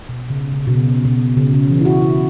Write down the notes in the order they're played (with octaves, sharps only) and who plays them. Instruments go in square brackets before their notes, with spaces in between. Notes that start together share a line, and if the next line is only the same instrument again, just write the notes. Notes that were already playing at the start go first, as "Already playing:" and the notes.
[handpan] B2
C#3
C#3
B2
C#3
B2
C#3
C#3
E3
E4
F#4
E4